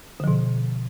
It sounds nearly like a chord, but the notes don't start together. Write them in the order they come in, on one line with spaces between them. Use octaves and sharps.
D3 F3 B2